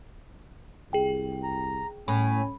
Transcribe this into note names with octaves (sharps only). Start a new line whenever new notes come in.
C2 G#4 G5
A#5
A2 C#4 G#5 B5